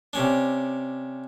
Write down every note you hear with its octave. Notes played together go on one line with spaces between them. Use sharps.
C3 C#4 D4